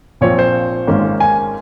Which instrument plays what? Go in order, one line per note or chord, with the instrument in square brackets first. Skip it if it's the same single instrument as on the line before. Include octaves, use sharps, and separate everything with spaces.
[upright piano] A#1 A#2 F3 C4 C#5
C5
G#1 G#2 D#3 A#3 C#4
G#5